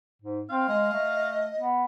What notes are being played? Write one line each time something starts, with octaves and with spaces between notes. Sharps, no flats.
G#2
C4 F5
G#3 D#5
A3
B3